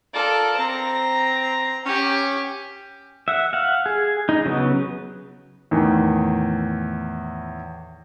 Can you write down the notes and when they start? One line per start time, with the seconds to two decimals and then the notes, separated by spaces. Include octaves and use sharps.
0.14 F4 A4 A#4 D5
0.58 C4 A#5
1.85 C#4 G4
3.28 E5 F#5
3.53 F5 F#5
3.86 G#4
4.29 D#4
4.45 C#3 F#3 B3
5.71 E2 A2 D#3